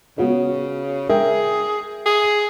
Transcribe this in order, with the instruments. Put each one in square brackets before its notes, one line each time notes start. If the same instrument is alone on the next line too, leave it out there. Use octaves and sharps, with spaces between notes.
[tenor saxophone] C#3 [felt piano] B3 F#4 C#5
[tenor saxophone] G#4 [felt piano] A#4 E5 G5
[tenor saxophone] G#4